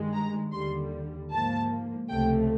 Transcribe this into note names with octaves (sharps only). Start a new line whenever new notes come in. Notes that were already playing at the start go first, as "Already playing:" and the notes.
Already playing: G2 D#3 G#3
A#5
D#2 D3 G3 C6
G#2 F3 A#3 A5
C#2 C3 F3 A3 G5